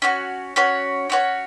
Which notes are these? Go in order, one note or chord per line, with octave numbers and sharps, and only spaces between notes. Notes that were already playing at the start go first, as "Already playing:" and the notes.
C#4 F#4 C#5
C#4 F#4 C#5
C#4 F#4 C#5